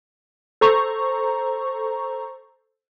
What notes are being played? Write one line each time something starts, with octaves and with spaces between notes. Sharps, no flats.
A4 C5 A#5 C#6